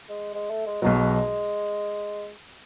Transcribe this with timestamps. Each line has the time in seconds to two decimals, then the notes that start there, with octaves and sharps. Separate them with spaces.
0.09 G#3
0.34 G#3
0.50 A3
0.66 G#3
0.82 B1 B2 F#3 G#3